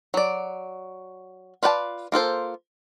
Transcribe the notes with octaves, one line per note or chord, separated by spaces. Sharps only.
F#3 D5
F4 B4 D5 F#5 A5
A#3 F4 A4 C5